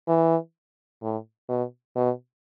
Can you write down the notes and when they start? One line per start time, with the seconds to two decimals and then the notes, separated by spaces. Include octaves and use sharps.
0.08 E3
1.02 A2
1.49 B2
1.96 B2